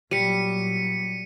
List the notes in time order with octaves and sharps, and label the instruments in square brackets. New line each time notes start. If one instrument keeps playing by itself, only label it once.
[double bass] A#2 F#3 [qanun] G3 [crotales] B6 C#7 D#7